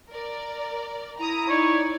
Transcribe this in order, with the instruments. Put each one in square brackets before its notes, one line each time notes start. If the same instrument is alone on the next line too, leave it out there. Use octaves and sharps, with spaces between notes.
[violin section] A#4 D5
[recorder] E4 [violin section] A#5 D#6
[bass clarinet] D#4 [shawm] C#5 [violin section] D5